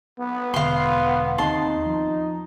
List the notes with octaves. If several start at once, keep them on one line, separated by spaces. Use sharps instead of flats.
B3
E1 D3 F5 C6
D#2 B3 C4 D#4 A5 C6
F3